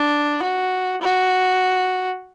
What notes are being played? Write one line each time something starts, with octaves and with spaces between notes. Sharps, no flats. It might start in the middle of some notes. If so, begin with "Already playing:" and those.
Already playing: D4
F#4
F#4